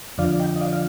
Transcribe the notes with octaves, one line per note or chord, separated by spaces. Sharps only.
F2 D3 F3 D5 F5
D#5 G5
D#5
D5 F5
F5